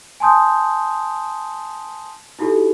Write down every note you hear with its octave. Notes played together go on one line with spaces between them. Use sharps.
G#5 A5 C6 D#6 G6
D#4 E4 F#4 G4 A4